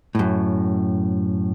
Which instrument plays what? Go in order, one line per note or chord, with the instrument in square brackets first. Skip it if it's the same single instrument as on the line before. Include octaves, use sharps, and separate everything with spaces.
[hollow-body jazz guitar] F#2 A2